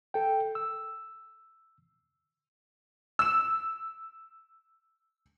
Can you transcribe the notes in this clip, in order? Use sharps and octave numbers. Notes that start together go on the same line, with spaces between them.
A4 G5
E6
E6 E7